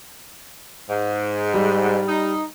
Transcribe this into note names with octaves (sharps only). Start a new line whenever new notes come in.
G#2
G3
D#4